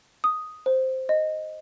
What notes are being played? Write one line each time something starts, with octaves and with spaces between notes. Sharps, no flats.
D#6
C5
D#5